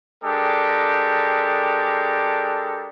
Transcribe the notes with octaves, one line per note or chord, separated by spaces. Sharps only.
G#3 D4 G4 A4 A#4